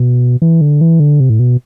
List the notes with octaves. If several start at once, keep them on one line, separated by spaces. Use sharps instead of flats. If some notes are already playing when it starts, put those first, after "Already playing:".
Already playing: B2
E3
D3
E3
D3
C3
A2
B2